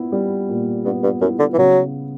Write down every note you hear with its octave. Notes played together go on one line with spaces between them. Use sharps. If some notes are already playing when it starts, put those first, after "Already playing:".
Already playing: A#2 B3 E4
G3
A#2
G2 B3
G2
F#2 E4
D3
E3
C#3 F#3